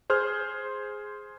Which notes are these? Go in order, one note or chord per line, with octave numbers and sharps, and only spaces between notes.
G#4 C5 C6 F6